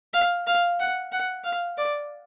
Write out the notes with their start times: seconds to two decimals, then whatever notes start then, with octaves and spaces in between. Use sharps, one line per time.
0.14 F5
0.47 F5
0.80 F#5
1.12 F#5
1.44 F5
1.78 D5